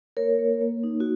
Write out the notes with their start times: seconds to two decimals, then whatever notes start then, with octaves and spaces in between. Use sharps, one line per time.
0.17 A#3 A#4 C#5
0.39 A#3
0.61 A#3
0.84 D#4
1.00 F#4